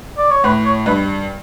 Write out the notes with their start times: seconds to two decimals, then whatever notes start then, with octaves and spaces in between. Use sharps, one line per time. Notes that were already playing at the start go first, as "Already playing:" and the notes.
0.18 D5
0.31 C#5
0.44 A2 B4
0.65 C#5
0.86 G2 B4